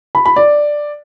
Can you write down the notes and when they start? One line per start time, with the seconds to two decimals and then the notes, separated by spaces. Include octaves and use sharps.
0.15 B5
0.26 B5
0.36 D5